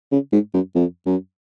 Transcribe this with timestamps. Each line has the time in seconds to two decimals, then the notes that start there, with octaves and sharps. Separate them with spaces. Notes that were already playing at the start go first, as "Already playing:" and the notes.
0.11 C#3
0.32 G#2
0.54 F#2
0.75 F2
1.06 F#2